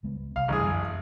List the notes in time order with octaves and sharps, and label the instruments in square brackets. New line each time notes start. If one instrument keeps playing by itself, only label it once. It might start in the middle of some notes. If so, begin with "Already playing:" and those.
[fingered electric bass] C#2 G#3 B3
[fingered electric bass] C2 [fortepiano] F5
[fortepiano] A1 G#4 [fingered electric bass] D3 G3
[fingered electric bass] F#2 B3